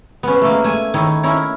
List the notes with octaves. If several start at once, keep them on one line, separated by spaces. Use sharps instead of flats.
B3 C#4
A3 A#3
A3 G#5
D#3 D#4 E4 C#5
C#4 E4 A#4 C#5